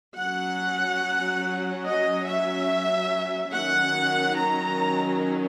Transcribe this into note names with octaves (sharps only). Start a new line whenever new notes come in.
F#3 C#4 F#5
D#5
E5
D#3 F#3 C#4 F#5
A#5